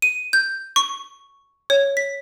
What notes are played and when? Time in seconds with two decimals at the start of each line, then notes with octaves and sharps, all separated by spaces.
0.02 D#7
0.33 G6
0.76 C#6
1.70 C#5
1.97 B6